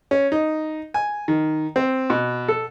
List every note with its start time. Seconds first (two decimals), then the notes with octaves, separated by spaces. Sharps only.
0.11 C#4
0.32 D#4
0.94 G#5
1.28 D#3
1.76 C4
2.10 B2
2.48 A4